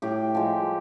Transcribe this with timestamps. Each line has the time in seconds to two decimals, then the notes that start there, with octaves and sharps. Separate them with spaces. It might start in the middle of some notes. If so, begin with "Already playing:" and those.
0.02 A2 G4
0.35 F3 G#3